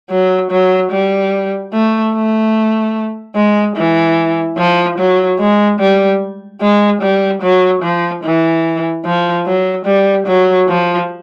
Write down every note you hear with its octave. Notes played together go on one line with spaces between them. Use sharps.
F#3
F#3
G3
A3
A3
G#3
E3
F3
F#3
G#3
G3
G#3
G3
F#3
F3
E3
F3
F#3
G3
F#3
F3